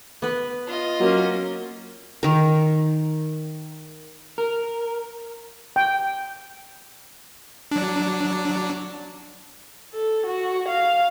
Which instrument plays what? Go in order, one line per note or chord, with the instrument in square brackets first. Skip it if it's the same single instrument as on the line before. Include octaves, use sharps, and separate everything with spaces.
[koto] B3 B4
[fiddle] F4 D#5
[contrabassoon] F#3 [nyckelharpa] A#3 C#4
[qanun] D#3 A#4
[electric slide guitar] A#4
[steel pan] G5
[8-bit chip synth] F#3 D4
[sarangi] A4
F#4
F5